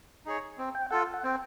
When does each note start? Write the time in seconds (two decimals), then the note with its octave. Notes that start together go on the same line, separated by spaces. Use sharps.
0.26 D#4 G#4 C#5
0.58 C4
0.75 G5
0.90 F4 A4 F#5
1.14 F#5
1.24 C4 G5